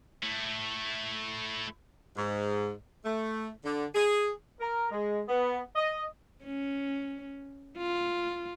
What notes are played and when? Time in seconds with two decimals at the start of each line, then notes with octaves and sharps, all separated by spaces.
0.23 A3 E4
2.17 G#2
3.05 A3
3.65 D3
3.95 G#4
4.61 A#4
4.91 G#3
5.28 B3
5.75 D#5
6.44 C#4
7.78 F4